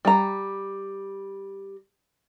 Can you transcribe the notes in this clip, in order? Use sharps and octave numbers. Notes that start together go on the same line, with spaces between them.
G3 A#5